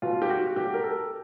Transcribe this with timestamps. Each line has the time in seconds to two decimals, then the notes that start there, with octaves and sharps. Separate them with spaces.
0.02 B2 F4
0.22 G4
0.30 F#4
0.56 B2 G4
0.74 A#4
0.83 A4